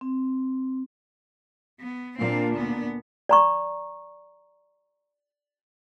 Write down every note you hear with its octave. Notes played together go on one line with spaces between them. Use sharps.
C4
B3
A#2 C4 D4 F5
D2 B3
D5 A#5 C#6